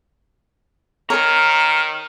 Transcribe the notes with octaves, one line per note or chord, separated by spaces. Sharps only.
D#3 A#4 C#5 A#5 F6